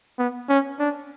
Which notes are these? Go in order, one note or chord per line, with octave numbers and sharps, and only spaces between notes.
B3
C#4
D4